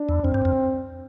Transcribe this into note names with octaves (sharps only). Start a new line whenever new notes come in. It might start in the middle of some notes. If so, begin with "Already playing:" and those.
Already playing: D4
E2
F2 C4
G2
F2